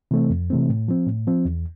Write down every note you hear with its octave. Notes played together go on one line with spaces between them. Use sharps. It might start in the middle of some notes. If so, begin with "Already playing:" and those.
C3 E3 A3 C4
F2
C3 E3 A3 C4
A2
F3 C4
A2
F3 C4
E2